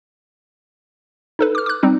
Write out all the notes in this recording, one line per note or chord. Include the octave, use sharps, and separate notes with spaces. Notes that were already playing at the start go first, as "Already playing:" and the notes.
D#4 A4 B4
D6 F6
D6 F#6
G3 C4 D#4